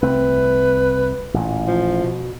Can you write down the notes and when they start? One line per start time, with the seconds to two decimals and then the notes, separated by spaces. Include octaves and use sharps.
0.02 C2 A3 C4 B4
1.34 A1 A#2
1.67 F3
2.04 B2